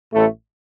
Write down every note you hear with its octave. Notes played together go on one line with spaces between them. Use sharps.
A1 A2 A3 A4